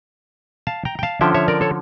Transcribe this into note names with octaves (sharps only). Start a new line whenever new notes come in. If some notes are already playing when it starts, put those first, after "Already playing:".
F5 A5
G5 A#5
G5
F5 A5
D3 F3 C#4 E5 G5
C#5 E5
A#4 D5
A4 C#5